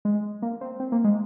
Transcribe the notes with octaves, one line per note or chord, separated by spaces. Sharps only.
G#3
A#3
C4
C4
A#3
G#3